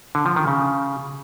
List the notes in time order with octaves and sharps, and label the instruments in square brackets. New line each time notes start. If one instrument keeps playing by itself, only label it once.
[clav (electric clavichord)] D3
F3
D#3
C#3